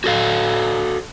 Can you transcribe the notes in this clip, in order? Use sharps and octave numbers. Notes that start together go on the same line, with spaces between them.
F#4 A4 F5